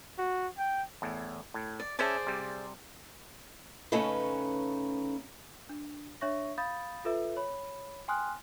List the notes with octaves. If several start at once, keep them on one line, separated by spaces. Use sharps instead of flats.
F#4
G5
E2 A2
A2
D5
C#4 G#4 C5 D5 E5 A5
C3 G3
C#3 A3 C#4 D#4 B4
D4
D4 C#5 E5 C#6 A#6
F5 B5 D#6 G6 A6
F4 A4 B4 E5
C#5 B5
G5 G#5 C6 D#6 F6 F#6